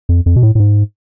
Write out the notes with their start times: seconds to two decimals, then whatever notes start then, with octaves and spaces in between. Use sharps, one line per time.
0.09 F2
0.26 F2
0.36 B2
0.43 A2
0.55 A2
0.60 G#2